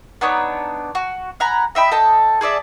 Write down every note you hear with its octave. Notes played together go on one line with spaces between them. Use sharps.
B3 D4 D#4 C#5
F#4
F#5 G#5 A#5 B5
D#5 E5 G5 B5
A4 D#5 G5 A5
G#4 A4 D5 E5